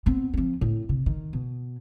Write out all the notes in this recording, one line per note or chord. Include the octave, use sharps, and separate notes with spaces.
B3 C4
F3 C4
A2
C3
D#3
B2